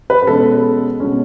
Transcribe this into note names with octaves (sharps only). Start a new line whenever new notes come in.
B4
B4
B2 G#3 C#4 A4
B2 G#3 C#4